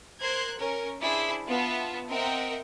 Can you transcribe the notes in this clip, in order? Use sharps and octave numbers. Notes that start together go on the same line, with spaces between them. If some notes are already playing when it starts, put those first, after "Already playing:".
A#4 C5 F#6 G#6
C#4 A#4
D4 E4 G#4 C5
B3 F4 E5 A5
C4 A#4 D#5 E5 F#5 G5